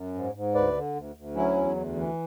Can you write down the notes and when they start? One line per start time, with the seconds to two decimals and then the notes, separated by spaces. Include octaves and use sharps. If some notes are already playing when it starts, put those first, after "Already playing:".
Already playing: F#2
0.15 G#2
0.35 G#2
0.55 D2 B4 D5
0.76 D3
0.96 D2
1.16 D2
1.35 F#3 C#4 E4
1.56 E2
1.76 D2
1.96 E3